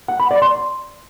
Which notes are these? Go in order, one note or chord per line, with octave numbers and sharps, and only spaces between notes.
F#5
B5
D5
C6